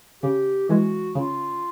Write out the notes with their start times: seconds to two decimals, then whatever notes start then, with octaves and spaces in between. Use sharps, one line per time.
0.23 C#3 G4
0.69 E3 G#3 F#4
1.15 C#3 F4